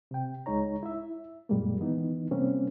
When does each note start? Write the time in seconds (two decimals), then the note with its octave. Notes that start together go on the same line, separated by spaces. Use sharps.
0.11 C3 G5
0.46 C#2 G#3 D#4 C#5 A#5
0.83 E4 E5
1.49 F#2 A#2 G3 G#3 A#3
1.81 D#3 E3 B3 D#4
2.31 C3 G3 A#3 C4 C#4